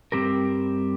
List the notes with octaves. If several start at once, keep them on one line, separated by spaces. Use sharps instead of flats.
G2 G3 C4 G4 A#4